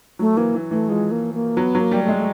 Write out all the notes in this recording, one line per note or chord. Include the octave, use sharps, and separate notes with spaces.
F#3 A3
E3 A#3
E3
E3 A3
F3 G#3
A#3
A#3
F#3 B3
F#3
A#3
G3
A3
G#3
A3